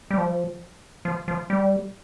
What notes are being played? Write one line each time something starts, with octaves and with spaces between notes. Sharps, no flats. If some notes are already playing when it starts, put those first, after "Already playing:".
G3
F3
F3
F3
G3